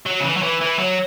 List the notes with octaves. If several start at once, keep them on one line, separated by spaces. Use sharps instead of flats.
F#3
C#3
E3
F#3
E3
E3
F#3